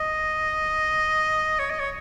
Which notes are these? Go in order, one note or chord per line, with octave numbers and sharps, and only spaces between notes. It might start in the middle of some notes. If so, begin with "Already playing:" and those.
Already playing: D#5
C#5
D#5
C#5